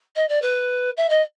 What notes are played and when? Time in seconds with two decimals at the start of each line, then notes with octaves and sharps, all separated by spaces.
0.16 D#5
0.29 D5
0.42 B4
0.97 E5
1.09 D#5